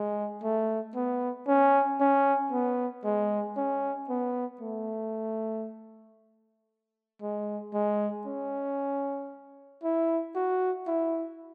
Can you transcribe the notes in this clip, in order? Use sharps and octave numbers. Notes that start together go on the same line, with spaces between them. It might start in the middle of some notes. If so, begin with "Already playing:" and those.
Already playing: G#3
A3
B3
C#4
C#4
B3
G#3
C#4
B3
A3
G#3
G#3
C#4
E4
F#4
E4